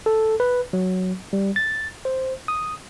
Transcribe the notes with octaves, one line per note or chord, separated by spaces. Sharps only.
A4
B4
F#3
G3
A6
C5
D#6